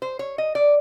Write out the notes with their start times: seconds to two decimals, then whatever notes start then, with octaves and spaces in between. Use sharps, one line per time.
0.02 C5
0.19 C#5
0.38 D#5
0.55 D5